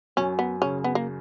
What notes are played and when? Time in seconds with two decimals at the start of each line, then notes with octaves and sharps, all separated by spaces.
0.17 F#2 C#4
0.39 B3
0.62 C#3 C#4
0.84 B3
0.95 A#3